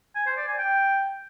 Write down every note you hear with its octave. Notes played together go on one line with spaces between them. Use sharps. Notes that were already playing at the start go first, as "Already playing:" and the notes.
G#5
C5
D5
G#5
G5